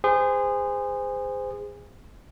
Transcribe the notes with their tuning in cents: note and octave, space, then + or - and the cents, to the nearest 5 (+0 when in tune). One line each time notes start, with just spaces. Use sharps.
G#4 -25 C5 -25